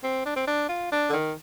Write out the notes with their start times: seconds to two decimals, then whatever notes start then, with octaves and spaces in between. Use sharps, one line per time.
0.04 C4
0.26 D4
0.36 C4
0.47 D4
0.69 F4
0.92 D4
1.10 D3
1.13 D#3